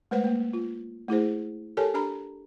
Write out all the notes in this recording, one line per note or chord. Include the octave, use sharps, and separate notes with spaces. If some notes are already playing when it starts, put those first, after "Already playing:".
G#3 A3 B4 C5 F#5
A#3
F4
A3 E4 G#4 C5
G4 A4 A#4 C#5 G#5 A5
D4 G4 A#5 B5